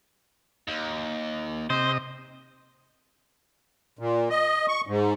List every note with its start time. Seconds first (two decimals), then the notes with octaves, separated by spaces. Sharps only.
0.68 D#2
1.70 C3 C5 D#5
3.99 A#2
4.30 D#5
4.68 C#6
4.87 G#2